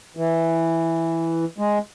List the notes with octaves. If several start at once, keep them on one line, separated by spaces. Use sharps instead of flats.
E3
G#3